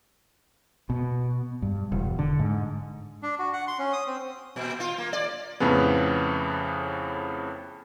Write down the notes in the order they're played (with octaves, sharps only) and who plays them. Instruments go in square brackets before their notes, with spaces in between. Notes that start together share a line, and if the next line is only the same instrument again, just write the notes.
[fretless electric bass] B2
G2
E1
D3
G#2
[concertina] D4
F#4
F#5
C6
C#4
D#6
C4
[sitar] A#2
F4
A#3
D5
[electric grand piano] F2 A2 C#3 B3